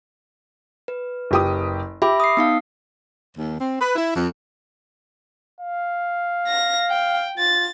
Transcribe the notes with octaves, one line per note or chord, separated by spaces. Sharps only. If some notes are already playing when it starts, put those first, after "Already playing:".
B4
F#1 G4 D#6
G4 E5 B5 D6
D#6 C7
B3 D#4 F5
D#2
C4
B4
E4
F2
F5
A#6
G5
F4 A6